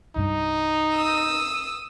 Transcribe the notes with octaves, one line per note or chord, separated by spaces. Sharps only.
C2 G2 G3 D#4
D#6 E6